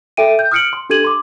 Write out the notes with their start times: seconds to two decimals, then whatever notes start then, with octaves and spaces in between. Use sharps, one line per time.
0.17 A4 E5 G5 D7 D#7
0.39 G6
0.52 D#6 F6 F#6 C#7 D7 F#7
0.73 C6
0.90 D4 G4 A4 G#6 D#7 F#7
1.05 C6 D6